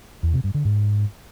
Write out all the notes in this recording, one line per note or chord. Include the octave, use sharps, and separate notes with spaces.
E2
C3
G2
D3
G#2